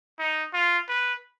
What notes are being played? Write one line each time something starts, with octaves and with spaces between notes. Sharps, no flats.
D#4
F4
B4